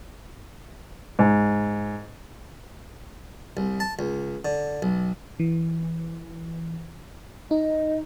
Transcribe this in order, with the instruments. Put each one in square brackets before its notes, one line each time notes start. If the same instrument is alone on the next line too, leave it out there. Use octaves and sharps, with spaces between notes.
[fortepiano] G#2
[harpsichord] C2
A5
C#2
D3
B1
[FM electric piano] E3
[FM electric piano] D#4 [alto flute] D#5